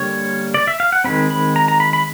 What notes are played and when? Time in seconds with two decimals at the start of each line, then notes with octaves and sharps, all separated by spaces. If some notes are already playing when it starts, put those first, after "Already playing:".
Already playing: D3 G3 A#3 C#5
0.54 D5
0.67 E5
0.80 F5
0.92 F#5
1.04 D#3 G#3 C4 B5
1.31 B5
1.56 A#5
1.68 A#5
1.80 B5
1.93 B5